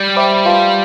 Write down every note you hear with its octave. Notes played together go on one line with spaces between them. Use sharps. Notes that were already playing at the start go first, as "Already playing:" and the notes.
Already playing: G3
C5 E5 G5 B5 D6
F4 B4 F5 A5 C6